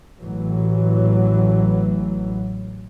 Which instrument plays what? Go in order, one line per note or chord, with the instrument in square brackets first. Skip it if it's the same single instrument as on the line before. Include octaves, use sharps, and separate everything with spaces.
[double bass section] A1 E3 F#3